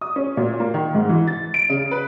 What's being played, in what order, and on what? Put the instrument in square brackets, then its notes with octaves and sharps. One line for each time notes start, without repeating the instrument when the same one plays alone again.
[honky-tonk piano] D#6
C#4
A#2
A#3
D#3
G#2
E3
A6
D7
C#3
B4